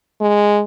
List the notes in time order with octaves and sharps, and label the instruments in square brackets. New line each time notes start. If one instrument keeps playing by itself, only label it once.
[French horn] G#3